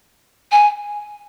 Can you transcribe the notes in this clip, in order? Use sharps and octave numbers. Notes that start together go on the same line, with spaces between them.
G#5